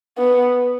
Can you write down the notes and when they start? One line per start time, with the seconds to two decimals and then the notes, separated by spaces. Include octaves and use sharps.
0.18 B3